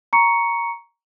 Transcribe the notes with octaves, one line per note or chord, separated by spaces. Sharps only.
A#5 C#6 C#7